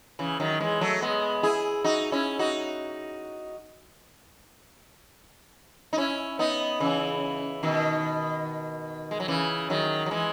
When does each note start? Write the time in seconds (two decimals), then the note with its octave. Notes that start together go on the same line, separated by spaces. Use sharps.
0.19 C#3 E3
0.40 D#3 F#3
0.60 E3 G#3
0.81 F#3 A3
1.02 G#3 B3
1.43 E4 G#4
1.84 D#4 F#4
2.12 C#4 E4
2.39 D#4 F#4
5.93 D#4
5.97 C#4 E4
6.39 B3 D#4
6.80 C#3 E3
7.63 B2 D#3
9.11 G#3
9.20 F#3
9.28 C#3 E3
9.70 D#3 F#3
10.06 F#3
10.11 E3 G#3